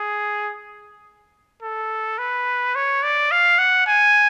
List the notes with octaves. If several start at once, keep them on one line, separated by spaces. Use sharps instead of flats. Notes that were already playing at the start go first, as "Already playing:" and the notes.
Already playing: G#4
A4
B4
C#5
D5
F5
F#5
G#5